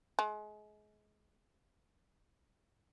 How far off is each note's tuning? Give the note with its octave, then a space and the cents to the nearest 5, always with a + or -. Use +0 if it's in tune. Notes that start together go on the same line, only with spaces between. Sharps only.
G#3 +30